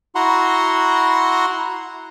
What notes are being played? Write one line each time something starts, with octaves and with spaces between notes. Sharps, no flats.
E4 F#4 F#5 A#5 C6